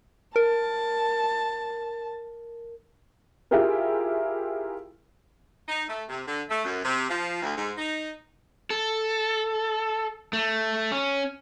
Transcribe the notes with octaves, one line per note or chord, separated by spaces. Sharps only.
A#4 A5
E4 F4 G4 G#4 A#4
D#4
A3
C3
D3
A3
F#2
C3
F3
D2
G#2
D#4
A4
A3
C#4